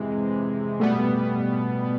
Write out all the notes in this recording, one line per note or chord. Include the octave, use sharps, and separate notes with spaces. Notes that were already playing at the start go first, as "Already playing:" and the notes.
Already playing: C3 E3 G#3
B2 G3 A3 B3